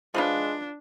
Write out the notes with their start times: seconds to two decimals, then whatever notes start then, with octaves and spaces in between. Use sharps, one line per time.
0.14 F3 G#3 D4 B4 F5